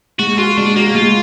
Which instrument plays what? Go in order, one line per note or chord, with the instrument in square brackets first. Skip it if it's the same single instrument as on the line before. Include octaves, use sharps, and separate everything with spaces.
[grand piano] G#3 [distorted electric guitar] F#4
[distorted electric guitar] F4 [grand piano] F#4
[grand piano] G#3 [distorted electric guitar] D4
[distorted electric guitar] A#3 [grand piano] F#4
[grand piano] G#3 [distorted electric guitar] F4